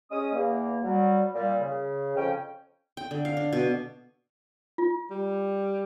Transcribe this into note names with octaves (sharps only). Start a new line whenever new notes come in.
G#3 C#4 D#6
E2 A#3
F#3 G3
A#2 G3
C#3
F2 C#4 G5
G5
D3
F5
D4
B2
F4
G3